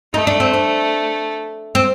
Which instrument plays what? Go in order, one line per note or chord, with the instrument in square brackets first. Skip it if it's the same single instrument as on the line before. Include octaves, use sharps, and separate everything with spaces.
[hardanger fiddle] A3 [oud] D#4
[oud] D4
C4
D4
C4